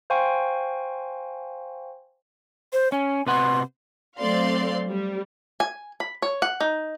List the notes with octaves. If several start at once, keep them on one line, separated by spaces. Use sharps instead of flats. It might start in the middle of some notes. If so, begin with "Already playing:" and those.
C5 F5 G5 G#5 C6 C#6
C5
C#4 G#5
C3 B4 F#5 C6
F#3 A3 C4 D5 F5 C6
G3
G#5
B5
C#5
F#5
D#4